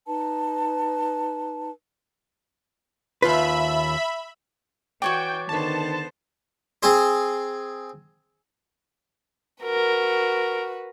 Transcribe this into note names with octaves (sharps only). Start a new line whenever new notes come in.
D#4 B4 A5
D#2 F4 B4 E5 B5
E3 F#4 C#5 D5 G5
D3 D#3 B3 C5 A5
C4 G#4 C5
F#4 A#4 B4